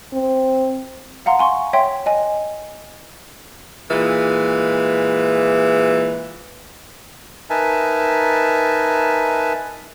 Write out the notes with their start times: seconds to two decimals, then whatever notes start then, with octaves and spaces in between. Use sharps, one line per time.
0.13 C4
1.26 F5 F#5 A#5 C6
1.39 G#5 C6 C#6
1.73 C#5 E5 G5 C6
2.06 D#5 G#5
3.90 A#2 E3 G#3
7.50 D#4 A#4 B4 E5 G#5 A5